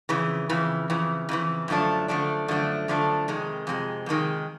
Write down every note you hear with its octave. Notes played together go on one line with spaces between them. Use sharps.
F2 C#3 E3
F2 C#3 E3
F2 C#3 E3
F2 C#3 E3
F#2 D3 F3 A3 D4
F#2 D3 F3 A3 D4
F#2 D3 F3 A3 D4
F#2 D3 F3 A3 D4
F2 C3 D#3 G#3
F2 C3 G#3
F2 C3 D#3 G#3